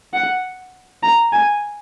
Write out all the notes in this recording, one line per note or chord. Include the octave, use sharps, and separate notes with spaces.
F#5
A#5
G#5